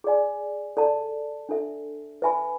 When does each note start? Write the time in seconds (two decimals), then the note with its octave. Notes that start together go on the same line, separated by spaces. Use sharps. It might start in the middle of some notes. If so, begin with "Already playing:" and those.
0.04 G#4 D5 G#5
0.77 A4 D5 A5
1.49 D4 A4 E5
2.22 B4 E5 G#5 B5